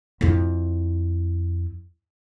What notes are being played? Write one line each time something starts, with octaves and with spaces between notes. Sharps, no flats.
F2 E4